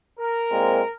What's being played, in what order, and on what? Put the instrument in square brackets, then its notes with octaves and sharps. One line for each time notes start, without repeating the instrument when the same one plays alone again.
[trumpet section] A#4
[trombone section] A#2 G#3 C4